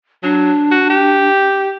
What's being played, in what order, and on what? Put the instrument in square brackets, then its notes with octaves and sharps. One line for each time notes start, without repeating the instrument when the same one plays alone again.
[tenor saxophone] F#3 [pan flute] D4
[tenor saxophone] F#4
G4